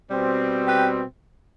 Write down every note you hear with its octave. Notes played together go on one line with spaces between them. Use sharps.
B2 G3 C4
G4 B4